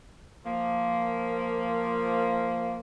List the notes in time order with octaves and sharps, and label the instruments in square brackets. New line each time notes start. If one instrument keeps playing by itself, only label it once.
[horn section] F3 A#3